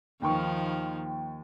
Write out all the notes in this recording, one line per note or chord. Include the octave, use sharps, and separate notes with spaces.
D#2 D#3 F3 G5 C#6